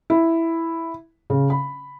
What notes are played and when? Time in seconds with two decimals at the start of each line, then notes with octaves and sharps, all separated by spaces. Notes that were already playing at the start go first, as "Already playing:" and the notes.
0.10 E4
1.30 C#3
1.50 B5